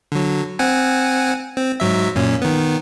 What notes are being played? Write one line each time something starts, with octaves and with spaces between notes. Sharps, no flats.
D3 F#3
C4 F#5 G#5
C4
G#2 F#3 E5
F#2 A#2 C#4
D#3 B3